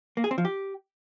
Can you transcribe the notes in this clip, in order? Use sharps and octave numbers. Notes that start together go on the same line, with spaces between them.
A#3
G#4
C4
F3
G4